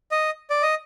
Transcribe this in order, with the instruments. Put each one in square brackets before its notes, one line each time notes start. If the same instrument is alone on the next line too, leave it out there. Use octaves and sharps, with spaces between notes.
[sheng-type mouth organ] D#5
D5
D#5